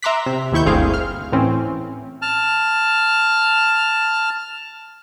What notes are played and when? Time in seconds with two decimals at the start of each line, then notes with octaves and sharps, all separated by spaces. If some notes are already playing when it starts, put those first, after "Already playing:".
0.03 E5 A#5 C6 D6 F#6 B6
0.26 C3
0.52 D#2 D#3 E4 C#6 G6
0.66 G1 D2 C4 G#4 F5
0.94 F6
1.32 A2 E3 C4 C#4
2.22 A5 F6